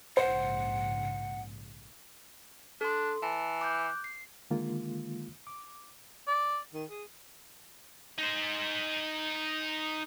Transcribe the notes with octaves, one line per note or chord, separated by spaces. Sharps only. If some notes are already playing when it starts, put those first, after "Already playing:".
A#1 G#2 C#3 C5 F#5
D4 A4 C6
E3 A5
D6 F#6 G6
C7
D3 D#3 G#3 A#3 F4
D6
D5
D#3
G#4
D#4 C5